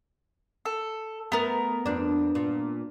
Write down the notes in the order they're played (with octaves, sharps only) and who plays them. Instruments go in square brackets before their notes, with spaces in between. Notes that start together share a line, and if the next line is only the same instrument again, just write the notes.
[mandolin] A4
[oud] A3 [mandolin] B3 A#4
[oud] F2 D4
A#2